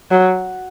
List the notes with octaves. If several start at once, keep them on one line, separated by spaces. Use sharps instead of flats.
F#3